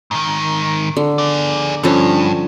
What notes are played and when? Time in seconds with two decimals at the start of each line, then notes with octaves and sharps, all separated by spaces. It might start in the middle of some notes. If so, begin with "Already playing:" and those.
0.11 G#2 D#3
0.97 D3
1.18 G#4 D5
1.83 G2 D3 F3 C#4